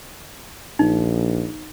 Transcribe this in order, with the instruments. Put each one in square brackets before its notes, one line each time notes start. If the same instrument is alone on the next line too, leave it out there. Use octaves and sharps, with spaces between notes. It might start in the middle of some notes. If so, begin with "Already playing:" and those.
[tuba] A#1 [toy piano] D#4